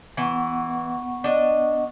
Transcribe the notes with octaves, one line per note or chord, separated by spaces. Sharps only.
E3 B3 F#5 C#6
D4 D#5